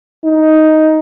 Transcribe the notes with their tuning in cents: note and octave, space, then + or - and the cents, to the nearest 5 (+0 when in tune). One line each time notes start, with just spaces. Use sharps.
D#4 +5